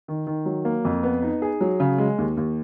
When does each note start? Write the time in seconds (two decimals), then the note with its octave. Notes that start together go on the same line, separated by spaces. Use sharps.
0.08 D#3
0.27 D#3
0.45 F#3
0.65 A#3
0.85 F2
1.03 B3
1.22 D#4
1.42 G#4
1.61 F#3
1.80 C#3
1.98 G#3
2.18 D#2
2.37 D#2